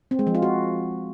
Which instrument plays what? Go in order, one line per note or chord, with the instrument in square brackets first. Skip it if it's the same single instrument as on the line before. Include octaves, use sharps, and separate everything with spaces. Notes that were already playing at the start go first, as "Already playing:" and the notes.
[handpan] C4
G#3
F3
F4
F#4